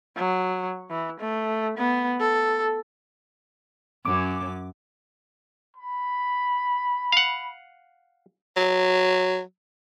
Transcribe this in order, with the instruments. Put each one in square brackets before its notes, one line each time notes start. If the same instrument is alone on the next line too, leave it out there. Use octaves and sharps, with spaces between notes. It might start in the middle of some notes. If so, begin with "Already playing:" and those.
[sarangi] F#3
E3
A3
B3
A4
[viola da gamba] F#2 [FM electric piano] D6
[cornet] B5
[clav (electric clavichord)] F5 F#5
[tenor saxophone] F#3